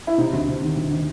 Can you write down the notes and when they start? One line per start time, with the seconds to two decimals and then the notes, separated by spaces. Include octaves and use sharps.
0.07 E4
0.18 C3 D#4
0.33 D2
0.48 C3
0.62 D#3
0.77 D2
0.91 D#3